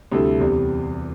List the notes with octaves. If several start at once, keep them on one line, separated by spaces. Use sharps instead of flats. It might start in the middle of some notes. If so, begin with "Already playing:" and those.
D2 C3 G3 E4 A4
E2 C3 G3